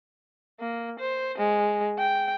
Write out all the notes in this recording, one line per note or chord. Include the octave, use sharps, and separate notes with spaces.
A#3
C5
G#3
G5